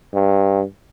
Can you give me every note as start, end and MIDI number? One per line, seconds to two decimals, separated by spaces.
0.14 0.62 43